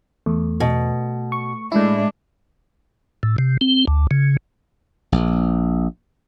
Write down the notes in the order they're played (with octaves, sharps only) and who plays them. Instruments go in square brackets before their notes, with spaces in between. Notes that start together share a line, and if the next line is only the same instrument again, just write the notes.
[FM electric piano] E2 [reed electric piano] A3
[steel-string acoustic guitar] B2
[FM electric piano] C#6
[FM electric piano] A2 E4 [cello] G#3 D4
[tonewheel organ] A2
C3
C4
D2
C#3
[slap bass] A#1